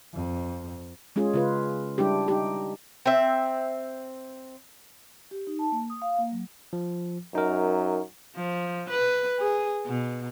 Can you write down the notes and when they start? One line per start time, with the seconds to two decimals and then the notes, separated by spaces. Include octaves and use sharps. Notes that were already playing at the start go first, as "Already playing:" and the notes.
0.15 F2
1.16 G#3 C#4 F4 G#4
1.34 C#3 F4 B4
1.98 G3 D4 E4 G4
2.28 D#4 G4
3.05 C4 E5
5.31 G4
5.47 D#4
5.59 A5
5.72 A#3
5.90 D#6
6.02 F5
6.18 A#3
6.32 F#3
6.73 F3
7.35 F#2 D#4 A#4
8.36 F3
8.90 B4
9.40 G#4
9.86 B2